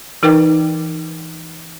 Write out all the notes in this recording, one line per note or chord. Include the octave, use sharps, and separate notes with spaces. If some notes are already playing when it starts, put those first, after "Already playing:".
E3 D#4 A#4 B4 G5 D6